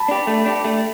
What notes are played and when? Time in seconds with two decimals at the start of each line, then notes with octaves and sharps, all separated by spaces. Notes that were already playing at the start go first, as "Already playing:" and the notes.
Already playing: A5 B5
0.08 D4 G4
0.27 A3
0.46 D4 G4
0.64 A3